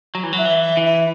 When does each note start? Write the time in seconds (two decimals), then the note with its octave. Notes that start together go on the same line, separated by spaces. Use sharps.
0.15 F#3
0.23 E3
0.33 F#3
0.38 E5
0.45 E3
0.61 E5
0.77 E3
0.84 E5